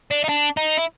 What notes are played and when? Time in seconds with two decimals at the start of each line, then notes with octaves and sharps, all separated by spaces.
0.11 D4
0.24 D#4
0.29 D4
0.57 D#4
0.78 E4